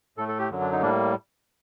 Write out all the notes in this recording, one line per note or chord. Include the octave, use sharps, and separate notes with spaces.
A2 A3 A4
A4
G4
F#2 D3 F#3
D4
D#4
A2 G3 A#3 D4